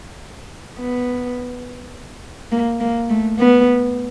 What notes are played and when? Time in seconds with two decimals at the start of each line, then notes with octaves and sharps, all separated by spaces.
0.78 B3
2.52 A#3
2.80 A#3
3.10 A3
3.39 B3